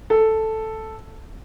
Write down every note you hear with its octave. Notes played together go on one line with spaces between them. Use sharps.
A4